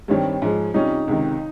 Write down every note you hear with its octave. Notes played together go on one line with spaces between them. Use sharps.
G2 D#3 G3 C4 C#5
G#2 F3 G#3
C3 G3 C#4 D#4 F4
C#2 C3 D#3